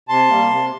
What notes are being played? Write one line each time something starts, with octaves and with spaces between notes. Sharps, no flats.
C3 A5 C6
G3 A#3
C3